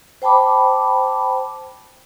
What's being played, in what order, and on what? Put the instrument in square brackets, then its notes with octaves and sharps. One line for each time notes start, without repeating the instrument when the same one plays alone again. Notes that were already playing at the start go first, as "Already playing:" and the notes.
[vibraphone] C5 G5 A5 B5 D6